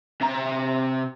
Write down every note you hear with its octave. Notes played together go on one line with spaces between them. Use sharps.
C3 A#5